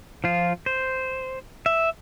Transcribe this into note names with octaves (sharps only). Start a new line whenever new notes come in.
F3 F4
C5
E5